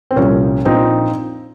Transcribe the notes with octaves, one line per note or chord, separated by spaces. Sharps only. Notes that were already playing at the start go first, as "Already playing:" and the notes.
C4
C2 A#2 F3 C#4
A#1 A#2 F3 C4 D#4